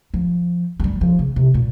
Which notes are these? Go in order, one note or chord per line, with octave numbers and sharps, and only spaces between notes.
F3
F3
G3
F3
C#3
C3
A#2